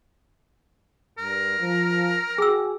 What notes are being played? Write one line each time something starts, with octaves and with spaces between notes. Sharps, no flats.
G2 A#4
F3
F#4 G#4 G5 G#5 E6